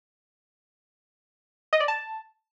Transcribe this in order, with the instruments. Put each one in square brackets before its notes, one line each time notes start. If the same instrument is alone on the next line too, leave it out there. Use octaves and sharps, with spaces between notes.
[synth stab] D#5
D5
A5